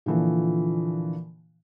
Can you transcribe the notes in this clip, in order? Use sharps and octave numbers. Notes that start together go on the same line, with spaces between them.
A#2 D3 E3 F3